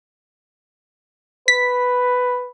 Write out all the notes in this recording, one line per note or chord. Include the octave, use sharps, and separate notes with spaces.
B4 B6